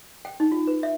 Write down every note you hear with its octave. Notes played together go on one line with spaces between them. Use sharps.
G5
D#4
F4
B4
E5